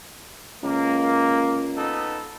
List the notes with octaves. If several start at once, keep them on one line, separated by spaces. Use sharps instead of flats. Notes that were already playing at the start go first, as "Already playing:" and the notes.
C#2 A#3
B3 D#4 A4